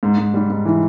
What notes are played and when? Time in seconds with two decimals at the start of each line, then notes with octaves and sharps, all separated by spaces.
0.03 G#2
0.18 G#2
0.34 G3
0.50 G#2
0.65 E3